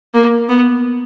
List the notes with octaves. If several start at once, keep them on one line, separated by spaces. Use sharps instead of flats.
A#3
B3